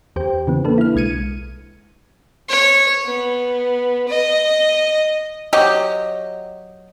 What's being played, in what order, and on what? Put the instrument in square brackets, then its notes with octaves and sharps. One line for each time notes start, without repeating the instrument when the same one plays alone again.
[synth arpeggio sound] E2 G4 C5 G5
C#3 E3 B3
A#3 D4 A4 B4
E4 F6
B1 G#3 G#6 C#7 D#7
[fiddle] C#5
B3
D#5
[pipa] F#3 G4 D#5